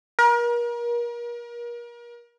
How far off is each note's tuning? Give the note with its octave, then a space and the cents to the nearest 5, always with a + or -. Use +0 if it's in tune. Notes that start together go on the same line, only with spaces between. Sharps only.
A#4 +35